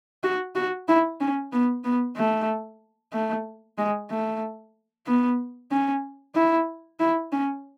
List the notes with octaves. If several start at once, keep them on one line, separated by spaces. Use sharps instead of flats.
F#4
F#4
E4
C#4
B3
B3
A3
A3
G#3
A3
B3
C#4
E4
E4
C#4